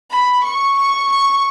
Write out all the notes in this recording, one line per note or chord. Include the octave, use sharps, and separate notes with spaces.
B5
C#6
C#6
C#6